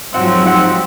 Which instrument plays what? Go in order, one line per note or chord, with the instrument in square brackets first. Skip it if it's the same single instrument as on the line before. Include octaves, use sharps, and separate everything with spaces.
[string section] G#2 F3 [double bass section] F#3 [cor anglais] C4 [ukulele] F#5
[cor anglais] C4 [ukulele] D#4 G4 F#5